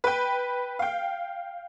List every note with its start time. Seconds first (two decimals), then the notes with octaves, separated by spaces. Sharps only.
0.04 B4 G5
0.79 F5 G5